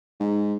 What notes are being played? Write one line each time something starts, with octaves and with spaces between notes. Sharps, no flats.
G#2